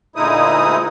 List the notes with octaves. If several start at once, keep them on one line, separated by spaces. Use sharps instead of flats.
D2 A#2 G#3 D#4 E4 D#6